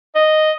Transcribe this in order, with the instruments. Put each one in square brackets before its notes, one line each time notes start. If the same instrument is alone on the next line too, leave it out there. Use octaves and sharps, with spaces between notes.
[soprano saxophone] D#5